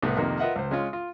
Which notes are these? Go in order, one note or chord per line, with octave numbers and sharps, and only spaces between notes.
C2 A2 B3
F2 C3 D#3 A#3
F4 A#4 B4 D#5 E5 F#5
C#2 C5
G#3 C#4 F4
F4